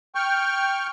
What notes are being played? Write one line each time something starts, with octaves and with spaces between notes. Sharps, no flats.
G5 C#6 F6